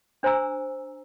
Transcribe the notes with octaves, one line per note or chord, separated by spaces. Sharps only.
D4 C5 G#5 A#5 E6